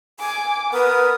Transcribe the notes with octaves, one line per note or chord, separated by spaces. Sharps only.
G#5 D6
B3 A#4 B4 D#6